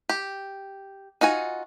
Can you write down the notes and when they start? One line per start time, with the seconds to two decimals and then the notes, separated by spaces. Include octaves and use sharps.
0.09 G4
1.21 D#4 F4 F#4 G#5